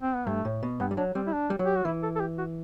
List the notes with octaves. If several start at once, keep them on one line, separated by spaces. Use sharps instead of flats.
C4
B3
G2 A3
A2
B2
G2 B3
G3
F#3 D4
G3 C4
E4
D4
G3
F#3
G4
F#4
E3 E4
A4
A4
G4
F#4